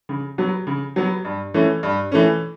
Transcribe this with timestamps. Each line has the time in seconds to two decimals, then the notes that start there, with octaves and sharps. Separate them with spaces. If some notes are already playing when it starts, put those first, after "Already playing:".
0.09 C#3
0.38 F#3 B3
0.67 C#3
0.96 F#3 B3
1.25 G2
1.54 E3 A3 C#4
1.83 G2
2.12 E3 A3 C#4